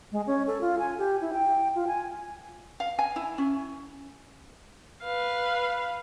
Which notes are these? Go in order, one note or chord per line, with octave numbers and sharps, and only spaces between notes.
G#3
C#4
A4
F4
G#5
G4
E4
G5
F4
G#5
F5
G#5
E4
C#4
B4 F5